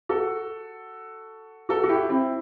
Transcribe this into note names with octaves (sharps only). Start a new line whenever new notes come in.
F#4 A4
F#4 A4
F#4
E4 G4
C4 E4